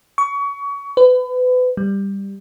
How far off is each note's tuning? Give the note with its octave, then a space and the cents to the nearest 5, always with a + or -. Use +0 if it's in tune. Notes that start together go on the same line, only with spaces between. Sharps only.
C#6 +30
B4 +30
G3 +10